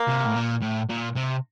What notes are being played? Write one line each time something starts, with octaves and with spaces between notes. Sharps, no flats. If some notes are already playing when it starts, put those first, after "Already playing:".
Already playing: A#3
C3
A2
A#2
A2
A#2
C3